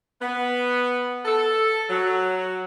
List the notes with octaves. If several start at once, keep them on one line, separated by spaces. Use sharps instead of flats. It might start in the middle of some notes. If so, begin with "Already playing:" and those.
B3
A4
F#3